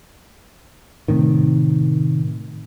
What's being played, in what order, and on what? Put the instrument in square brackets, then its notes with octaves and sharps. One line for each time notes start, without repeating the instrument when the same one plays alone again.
[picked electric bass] A2 C3 D#3